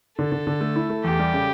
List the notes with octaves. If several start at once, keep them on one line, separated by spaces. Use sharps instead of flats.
D3 A4
D3
D3
A3
E4
A3
E2 G4
G3
C#3